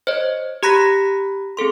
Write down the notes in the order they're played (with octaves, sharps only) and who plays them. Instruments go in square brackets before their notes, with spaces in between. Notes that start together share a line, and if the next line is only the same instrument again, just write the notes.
[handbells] C5 C#5 D#5
G4 A#5 B5 F#6 A#6 B6
C4 G#4 A4 C6